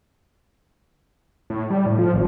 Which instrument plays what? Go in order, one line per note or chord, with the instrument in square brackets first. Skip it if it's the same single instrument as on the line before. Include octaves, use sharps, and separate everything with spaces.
[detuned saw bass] A2
G3
A2
F3
G#1